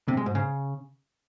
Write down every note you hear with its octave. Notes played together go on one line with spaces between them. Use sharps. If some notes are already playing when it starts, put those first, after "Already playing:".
C3
G#3
G#2
C#3